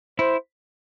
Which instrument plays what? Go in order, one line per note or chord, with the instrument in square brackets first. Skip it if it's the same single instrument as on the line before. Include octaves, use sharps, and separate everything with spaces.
[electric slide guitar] E4 [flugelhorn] C5